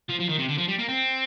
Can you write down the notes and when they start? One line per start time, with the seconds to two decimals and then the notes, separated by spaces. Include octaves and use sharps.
0.09 F3
0.20 F3
0.29 D#3
0.38 C3
0.49 D3
0.58 F3
0.68 G3
0.79 A#3
0.89 C4